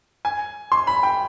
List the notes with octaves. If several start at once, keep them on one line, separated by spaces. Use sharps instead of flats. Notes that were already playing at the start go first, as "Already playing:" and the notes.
G#5
C6
B5
G5